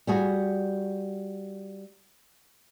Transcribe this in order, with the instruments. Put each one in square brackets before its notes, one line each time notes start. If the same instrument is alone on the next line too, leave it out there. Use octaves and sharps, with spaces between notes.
[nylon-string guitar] G3 F#4 G#4